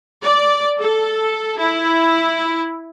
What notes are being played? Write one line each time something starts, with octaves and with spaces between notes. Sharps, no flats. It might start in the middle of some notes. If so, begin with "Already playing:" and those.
D5
A4
E4